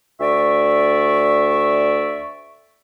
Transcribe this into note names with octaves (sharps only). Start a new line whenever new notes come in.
D2 D5 E5 C#6